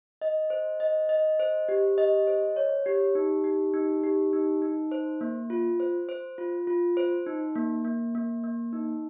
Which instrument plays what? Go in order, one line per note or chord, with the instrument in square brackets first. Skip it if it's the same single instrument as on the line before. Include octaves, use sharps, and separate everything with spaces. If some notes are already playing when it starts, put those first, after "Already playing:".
[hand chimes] D#5
C5
D#5
D#5
C5
G4
D#5
C5
C#5
G4
D#4
G4
D#4
G4
D#4
D#4
C5
A#3
F4
C5
C5
F4
F4
C5
D#4
A#3
A#3
A#3
A#3
D#4